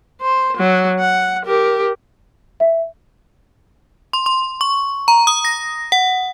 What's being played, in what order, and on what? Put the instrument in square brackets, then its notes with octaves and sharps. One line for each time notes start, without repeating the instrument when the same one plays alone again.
[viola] C5
F#3
F#5
G4 A#4
[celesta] E5
[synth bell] C6
C6
C#6
A#5
D#6
A#6
F#5